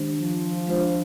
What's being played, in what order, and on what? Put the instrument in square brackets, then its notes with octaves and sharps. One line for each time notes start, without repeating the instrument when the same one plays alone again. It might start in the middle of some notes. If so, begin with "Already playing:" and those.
Already playing: [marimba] D#3 G#3 D4 G4 C5
[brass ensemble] F3
[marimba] G#3 D4 F4 C5